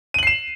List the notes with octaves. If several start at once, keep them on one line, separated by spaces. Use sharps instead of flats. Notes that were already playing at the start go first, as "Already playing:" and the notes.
C7 D#7 E7 F#7